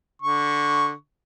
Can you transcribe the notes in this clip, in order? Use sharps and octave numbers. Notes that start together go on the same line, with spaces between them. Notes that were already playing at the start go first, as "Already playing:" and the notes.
D3 C#6